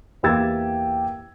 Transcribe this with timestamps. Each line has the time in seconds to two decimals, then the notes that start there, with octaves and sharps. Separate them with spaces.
0.23 E2 A#3 G4 E6 G#6 A6